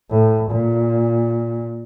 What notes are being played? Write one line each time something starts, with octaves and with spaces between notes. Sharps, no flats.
A2
A#2